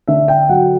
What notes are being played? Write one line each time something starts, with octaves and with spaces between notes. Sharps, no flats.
D3 E5
G5
F#3 F#5